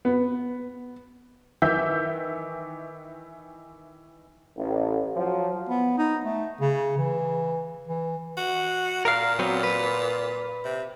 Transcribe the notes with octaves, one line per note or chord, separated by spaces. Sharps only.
B3
D#3 E3 E5 G6
A1
F3 F#3
B3
D#4
A3
C#3
E3
E3
F#4
A#2 A#4 F5
F#3 B3 C4
B4
C3